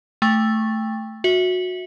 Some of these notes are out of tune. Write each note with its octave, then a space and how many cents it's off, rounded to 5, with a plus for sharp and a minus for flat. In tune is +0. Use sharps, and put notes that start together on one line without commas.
A3 +0 G5 +20 C#6 -15
F#4 -20 E5 -10